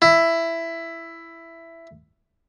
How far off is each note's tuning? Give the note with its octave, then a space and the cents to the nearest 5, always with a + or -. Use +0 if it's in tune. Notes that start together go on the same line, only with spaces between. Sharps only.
E4 +10